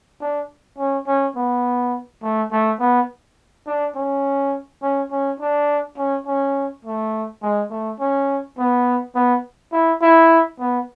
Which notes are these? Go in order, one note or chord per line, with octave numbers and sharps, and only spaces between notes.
D4
C#4
C#4
B3
A3
A3
B3
D4
C#4
C#4
C#4
D4
C#4
C#4
A3
G#3
A3
C#4
B3
B3
E4
E4
B3